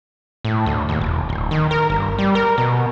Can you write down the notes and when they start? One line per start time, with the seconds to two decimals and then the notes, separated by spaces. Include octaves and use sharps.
0.45 A2
0.66 D2
0.89 D#2
1.01 E1
1.29 D1
1.51 D#3
1.71 A#4
1.90 G1
2.18 G3
2.35 A#4
2.58 B2